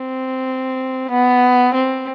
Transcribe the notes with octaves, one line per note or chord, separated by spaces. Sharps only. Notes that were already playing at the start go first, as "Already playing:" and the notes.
Already playing: C4
B3
C4